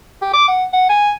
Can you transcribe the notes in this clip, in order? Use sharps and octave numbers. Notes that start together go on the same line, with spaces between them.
G4
D6
F#5
F#5
G#5